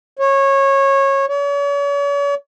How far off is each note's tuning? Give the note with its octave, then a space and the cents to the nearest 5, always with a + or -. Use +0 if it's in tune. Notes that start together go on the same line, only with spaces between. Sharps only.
C#5 -20
C#5 +40